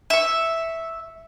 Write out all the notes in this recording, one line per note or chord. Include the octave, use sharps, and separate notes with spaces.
E5 C#6